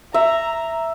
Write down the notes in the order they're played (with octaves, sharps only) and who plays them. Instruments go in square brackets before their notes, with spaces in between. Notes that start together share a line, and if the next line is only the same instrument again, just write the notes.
[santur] E5 [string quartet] A#5